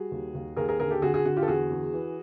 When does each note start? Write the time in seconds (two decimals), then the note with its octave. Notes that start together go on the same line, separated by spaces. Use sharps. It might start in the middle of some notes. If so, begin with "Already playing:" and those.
Already playing: G3 F#4 G#4
0.12 D#2
0.35 D#2
0.57 D#2 G#4 A#4
0.69 G#4 A#4
0.80 D3 G#4 A#4
0.91 G4 A4
1.02 D3 F#4 G#4
1.14 F#4 G#4
1.25 D3 F#4
1.36 F4 G4
1.43 A4
1.48 E2 F#4 G#4
1.70 E2
1.93 E3